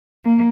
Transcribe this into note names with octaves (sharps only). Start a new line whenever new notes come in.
A#3